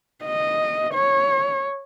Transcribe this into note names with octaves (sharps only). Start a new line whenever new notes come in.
D#5
C#5